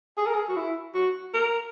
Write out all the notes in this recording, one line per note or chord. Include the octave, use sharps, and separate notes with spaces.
G#4
A#4
G#4
F#4
E4
F#4
A#4